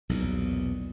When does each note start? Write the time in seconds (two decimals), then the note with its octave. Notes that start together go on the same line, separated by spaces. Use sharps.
0.09 B1 E2 A#2